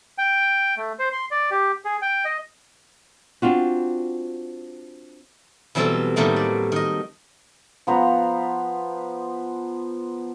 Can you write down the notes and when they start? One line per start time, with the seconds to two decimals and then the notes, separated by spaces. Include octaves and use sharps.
0.18 G5
0.77 A3
0.99 C5
1.12 C6
1.31 D5
1.51 G4
1.85 G#4
2.02 G5
2.25 D#5
3.42 C4 D4 F4 F#4
5.75 B2 E3 F#3 G3 C4 A4
6.16 A2 D#3 F#3 G3 A3 A#3
6.36 D5
6.72 D#3 D#5
7.87 F3 B3 C5 A#5